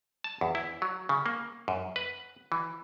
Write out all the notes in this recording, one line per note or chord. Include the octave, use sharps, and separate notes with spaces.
A5
E2
E4
F#3
C#3
A#3
F#2
B4
E3